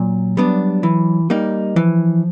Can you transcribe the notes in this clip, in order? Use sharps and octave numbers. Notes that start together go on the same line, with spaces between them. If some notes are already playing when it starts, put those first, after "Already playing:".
Already playing: A#2 F#3
G3 B3 D4
E3
G3 A#3 D#4
E3 F3